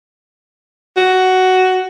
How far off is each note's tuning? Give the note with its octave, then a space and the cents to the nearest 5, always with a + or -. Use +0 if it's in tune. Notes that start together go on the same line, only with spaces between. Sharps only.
F#4 +10